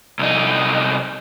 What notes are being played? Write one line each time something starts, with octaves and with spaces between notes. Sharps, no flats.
C2 D#4